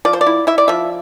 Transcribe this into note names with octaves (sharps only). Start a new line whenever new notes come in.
F3 D5
C5
D5
E4
E4 E5
D5
F3 E5